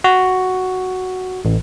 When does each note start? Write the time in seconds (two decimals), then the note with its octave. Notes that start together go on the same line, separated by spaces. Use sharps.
0.04 F#4
1.45 A1